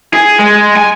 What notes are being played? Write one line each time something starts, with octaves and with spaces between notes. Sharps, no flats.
G#4
G#3
G#5